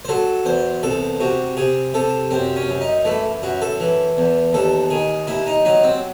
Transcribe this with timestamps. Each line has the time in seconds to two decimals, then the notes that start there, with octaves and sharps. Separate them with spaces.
0.05 C5
0.08 F#3 A4
0.45 E2 C5
0.83 C2 A4
1.20 C3 F#4
1.57 C3 G#4
1.94 C3 A4
2.31 F#2 C4
2.56 C#4
2.69 F#2
2.81 D#4
3.05 E3 A3
3.42 F#2 F#4
3.61 A4
3.80 E3
4.17 E2
4.53 D#2 A4
4.90 D#3 G#4
5.27 D#2 E4
5.47 D#4
5.65 F#3 D#4
5.83 C4